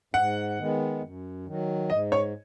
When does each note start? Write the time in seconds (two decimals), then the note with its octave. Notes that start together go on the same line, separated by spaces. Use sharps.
0.14 G#2 F#5
0.58 D#3 G#3 B3
1.02 F#2
1.46 D#3 F#3
1.89 G#2 D#5
2.12 C#5